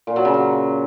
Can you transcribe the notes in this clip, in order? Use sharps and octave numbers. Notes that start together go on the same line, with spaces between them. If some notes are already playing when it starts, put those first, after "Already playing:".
A#2
F#3
C#3
F#3